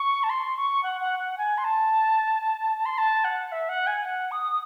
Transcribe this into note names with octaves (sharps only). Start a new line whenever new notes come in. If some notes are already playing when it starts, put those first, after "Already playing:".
Already playing: C#6
A5
C6
C#6
F#5
F#5
F#5
G#5
C6
A5
C6
A5
F#5
E5
F#5
G#5
F#5
D#6